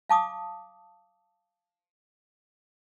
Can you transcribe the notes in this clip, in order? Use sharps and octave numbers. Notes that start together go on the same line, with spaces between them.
F5 A5 D6 D#6